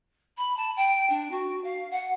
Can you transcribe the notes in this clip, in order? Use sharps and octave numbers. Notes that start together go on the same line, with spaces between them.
B5
A5
G5
D4
F#4
F5
F#5